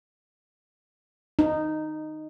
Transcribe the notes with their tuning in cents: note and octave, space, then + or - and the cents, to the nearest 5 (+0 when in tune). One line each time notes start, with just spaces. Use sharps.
D#4 -10